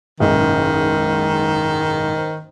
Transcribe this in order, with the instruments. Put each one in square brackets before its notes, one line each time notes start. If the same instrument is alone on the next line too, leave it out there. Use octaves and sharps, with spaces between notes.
[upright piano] F#1 B1 G#2 [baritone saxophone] D#3
[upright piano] C5